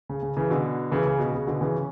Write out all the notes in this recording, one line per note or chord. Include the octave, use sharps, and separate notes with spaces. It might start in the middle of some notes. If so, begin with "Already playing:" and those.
C#3
C#3
C#3 E3
B2 D3
C#3 E3
C#3
B2
C#3
B2 D3
C#3 E3
C#4